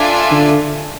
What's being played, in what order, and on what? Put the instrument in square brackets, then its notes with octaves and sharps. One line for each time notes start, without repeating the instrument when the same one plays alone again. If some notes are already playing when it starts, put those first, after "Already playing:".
Already playing: [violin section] D4 F4 A4 E5 G#5
[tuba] D3